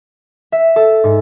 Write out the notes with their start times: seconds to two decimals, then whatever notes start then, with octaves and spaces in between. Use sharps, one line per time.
0.52 E5
0.76 A4
1.04 G#2